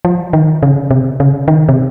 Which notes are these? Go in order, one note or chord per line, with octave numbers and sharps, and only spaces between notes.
F3
D#3
C#3
C3
C#3
D#3
C3